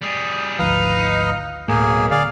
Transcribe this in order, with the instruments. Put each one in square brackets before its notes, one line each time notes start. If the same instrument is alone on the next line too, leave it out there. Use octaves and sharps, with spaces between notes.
[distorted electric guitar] G3 G#4
[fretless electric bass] G#1 D2 F3 [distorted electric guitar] D#4 [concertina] B4 F5
[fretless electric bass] D1 A2 A3 [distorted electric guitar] B1 [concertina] A#3 G#4
[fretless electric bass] D3 [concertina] G#4 D5 F5